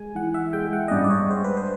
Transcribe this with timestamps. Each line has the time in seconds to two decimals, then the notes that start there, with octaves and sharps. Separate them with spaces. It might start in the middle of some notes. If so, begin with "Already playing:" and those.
Already playing: G#3 G#5
0.15 E3 F#5
0.34 E5
0.53 G#3 G5
0.73 F#5
0.88 D#5
0.91 G2 D5
1.04 D5
1.10 C#5
1.29 G#3 C5
1.44 B4
1.57 C5